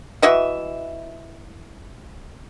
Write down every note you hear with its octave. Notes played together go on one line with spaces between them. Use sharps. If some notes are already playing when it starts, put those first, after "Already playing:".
E3 F#4 D#5 E5